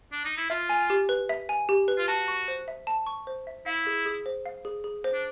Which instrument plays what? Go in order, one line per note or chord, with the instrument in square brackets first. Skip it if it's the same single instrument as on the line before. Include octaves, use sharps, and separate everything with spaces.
[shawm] D4
D#4
E4
[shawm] F4 [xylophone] E5
[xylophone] G#5
G4
B4
E5
G#5
G4
B4
[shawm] F4
[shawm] F#4 [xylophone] A5
[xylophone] C#6
C5
E5
A5
C#6
C5
E5
[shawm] E4 [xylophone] F5
[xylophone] G#4
G#4
C5
F5
G#4
G#4
C5
[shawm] D4